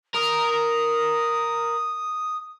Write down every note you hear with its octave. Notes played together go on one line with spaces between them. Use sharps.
A#4 D#6